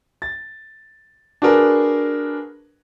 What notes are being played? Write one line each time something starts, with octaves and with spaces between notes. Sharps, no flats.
A6
D4 F#4 G#4 A#4 B4